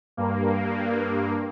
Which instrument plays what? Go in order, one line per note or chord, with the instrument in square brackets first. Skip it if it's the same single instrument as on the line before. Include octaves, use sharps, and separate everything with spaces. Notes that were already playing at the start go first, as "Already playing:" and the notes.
[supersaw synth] G2 A#3